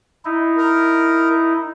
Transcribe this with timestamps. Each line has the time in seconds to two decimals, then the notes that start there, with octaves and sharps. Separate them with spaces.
0.25 D#4 E4
0.57 A#4